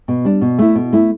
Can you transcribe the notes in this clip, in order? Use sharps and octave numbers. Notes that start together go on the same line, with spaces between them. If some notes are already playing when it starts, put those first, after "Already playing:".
B2
G3 D4
B2
A3 E4
B2
A3 E4